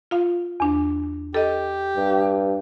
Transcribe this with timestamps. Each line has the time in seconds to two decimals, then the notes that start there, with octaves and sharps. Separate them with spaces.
0.11 F4 F5
0.60 E2 D4
1.34 G4 A4 D#5
1.97 G2